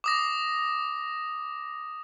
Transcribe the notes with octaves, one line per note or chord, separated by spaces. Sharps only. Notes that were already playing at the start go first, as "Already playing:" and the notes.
D6 D#6 A#6